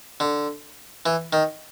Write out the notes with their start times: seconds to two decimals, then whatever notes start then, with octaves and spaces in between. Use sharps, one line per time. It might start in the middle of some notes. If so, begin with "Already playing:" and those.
0.20 D3
1.06 E3
1.33 D#3